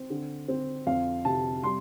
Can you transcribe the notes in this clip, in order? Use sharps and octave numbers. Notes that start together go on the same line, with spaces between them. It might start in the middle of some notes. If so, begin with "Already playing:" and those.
Already playing: C4
D3
C4
F2 F5
C3 A5
G3 C6